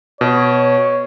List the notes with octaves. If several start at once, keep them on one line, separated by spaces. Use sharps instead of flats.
B2 C#5